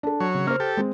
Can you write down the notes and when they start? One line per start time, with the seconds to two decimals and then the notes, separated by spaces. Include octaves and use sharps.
0.03 D4 A4
0.20 F#3 C#5
0.34 C#3
0.47 A#3 C#4 C5 F6
0.60 G4 A4
0.77 G#3 C4